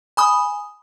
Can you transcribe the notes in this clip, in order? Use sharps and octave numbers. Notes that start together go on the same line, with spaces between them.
G#5 B5 D#6